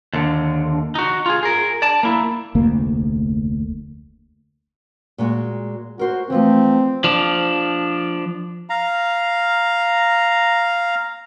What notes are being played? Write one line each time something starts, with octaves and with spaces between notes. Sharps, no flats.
D#2 D3
D#4 F#4
F4 G#4
G#4 A#4
D5 A5
A#3 E4
F1 D2 A#3
A#2 G#3 F#4
F#4 A#4 C5
E3 F3 A3 C4
F3 D4
F5 A#5